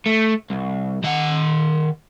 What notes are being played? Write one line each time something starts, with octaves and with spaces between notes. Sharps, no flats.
A3
C2
D#3 F#5